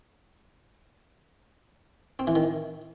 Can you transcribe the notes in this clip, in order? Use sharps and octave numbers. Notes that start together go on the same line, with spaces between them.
C4
E3
D#3